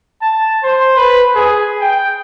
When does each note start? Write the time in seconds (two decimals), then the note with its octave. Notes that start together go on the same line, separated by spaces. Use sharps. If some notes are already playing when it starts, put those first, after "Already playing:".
0.22 A5
0.63 C5
0.97 B4
1.35 G#4
1.80 G5